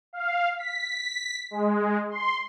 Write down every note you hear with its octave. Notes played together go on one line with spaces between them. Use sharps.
F5
B6
G#3
C6